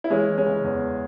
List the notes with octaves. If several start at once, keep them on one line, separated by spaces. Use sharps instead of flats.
E4
E3 G#3 C#4
E3
G#3 C#4
C#3
E2